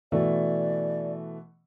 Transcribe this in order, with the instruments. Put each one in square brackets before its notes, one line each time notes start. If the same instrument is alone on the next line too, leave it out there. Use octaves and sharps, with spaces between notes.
[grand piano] B2 E3 A3 [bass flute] D5